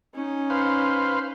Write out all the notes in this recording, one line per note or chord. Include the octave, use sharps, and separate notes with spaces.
C#4 D#4
B4 C5 F5